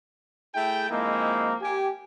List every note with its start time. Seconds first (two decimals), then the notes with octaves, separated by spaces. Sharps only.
0.55 A3 E4 G#4 G5
0.90 F3 G#3 A#3 C4 D#4 E4
1.62 G4 G#5